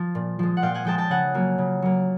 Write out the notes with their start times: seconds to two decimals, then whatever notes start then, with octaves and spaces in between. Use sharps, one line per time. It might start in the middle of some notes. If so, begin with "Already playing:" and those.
Already playing: F3
0.15 A#2
0.39 F3 G#3
0.57 F#5
0.62 A#2 F5 G5
0.74 F#5 G#5
0.85 F3 G#3 G5 A5
0.98 G5 A5
1.10 C#3 F#5 G#5
1.34 F#3 A#3
1.58 C#3
1.82 F#3 A#3